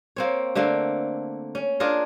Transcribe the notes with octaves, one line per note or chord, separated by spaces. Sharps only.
A#3 C4 C#5
D3 A3 A#3 C4
C#4
D4 F4 G#4 A#4